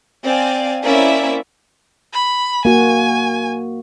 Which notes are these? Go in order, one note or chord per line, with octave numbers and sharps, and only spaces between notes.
C4 D5 F5 G#5
A#3 C4 C#4 E4 D5 E5
B5
A#3 F#4 G#5